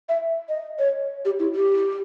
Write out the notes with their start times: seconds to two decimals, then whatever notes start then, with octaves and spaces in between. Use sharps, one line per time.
0.09 E5
0.49 D#5
0.79 C#5
1.25 G4
1.39 E4
1.55 G4